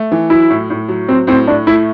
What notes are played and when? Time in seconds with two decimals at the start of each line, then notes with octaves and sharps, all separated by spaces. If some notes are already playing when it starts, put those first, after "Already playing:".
Already playing: A3
0.12 E3
0.30 F#3 E4
0.50 A2
0.70 A2
0.88 F#3
1.08 F#3 C4
1.27 A2 C4
1.48 A2 D4
1.67 A3 E4